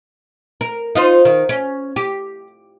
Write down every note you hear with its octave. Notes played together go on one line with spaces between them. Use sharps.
A#4
D#4 F4 C5
D#3
C#4
G4